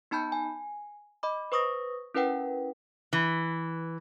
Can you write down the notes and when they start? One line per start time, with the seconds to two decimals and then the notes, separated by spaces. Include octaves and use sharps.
0.11 B3 D#4 A5 B5 G6 C#7
0.32 G#5
1.23 D#5 B5 D6
1.52 B4 C5 C#6 D#6 E6 A#6
2.14 C#4 E4 A#4 B4 F#5 G5
3.13 E3